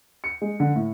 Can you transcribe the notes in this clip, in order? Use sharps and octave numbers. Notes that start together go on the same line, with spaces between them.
C#7
G#3
D3
A2